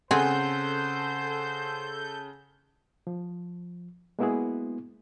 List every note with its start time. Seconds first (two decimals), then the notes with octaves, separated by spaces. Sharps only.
0.11 C#3 C4 G#4 A4 C5 F#5 G#5 G6
3.07 F3
4.19 G#3 A#3 B3 E4 F#4 G#4